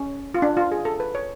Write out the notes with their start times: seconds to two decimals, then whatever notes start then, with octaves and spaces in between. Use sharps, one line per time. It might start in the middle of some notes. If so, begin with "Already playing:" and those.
Already playing: C#4
0.34 F4
0.42 D4
0.57 F4
0.72 G#4
0.85 A4
1.00 B4
1.15 C#5